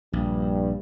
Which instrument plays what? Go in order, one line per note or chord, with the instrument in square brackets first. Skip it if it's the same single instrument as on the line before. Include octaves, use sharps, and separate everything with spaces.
[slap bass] A#1 [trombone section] G2